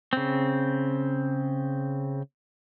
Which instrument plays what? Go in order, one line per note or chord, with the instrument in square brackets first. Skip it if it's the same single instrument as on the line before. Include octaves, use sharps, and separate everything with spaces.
[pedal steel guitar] C#3 C4